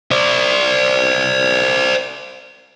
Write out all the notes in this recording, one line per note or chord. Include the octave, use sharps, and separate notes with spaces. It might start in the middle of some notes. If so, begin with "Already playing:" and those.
C5 D5